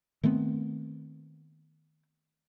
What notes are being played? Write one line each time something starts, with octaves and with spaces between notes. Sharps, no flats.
D#3 A3 B3 C4